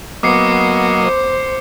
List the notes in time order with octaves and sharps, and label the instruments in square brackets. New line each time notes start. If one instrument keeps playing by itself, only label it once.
[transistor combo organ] F#3 A#3 D#5 [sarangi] B3 [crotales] D6 C7 C#7
[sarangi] C5